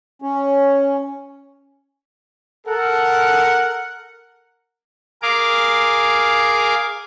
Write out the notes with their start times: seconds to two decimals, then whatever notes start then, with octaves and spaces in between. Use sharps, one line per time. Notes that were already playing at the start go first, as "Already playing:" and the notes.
0.22 C#4
2.67 A4 A#4 F#5
5.22 G#4 A#4 F5 D6